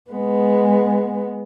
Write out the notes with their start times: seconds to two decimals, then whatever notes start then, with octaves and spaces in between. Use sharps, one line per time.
0.11 G#3 B3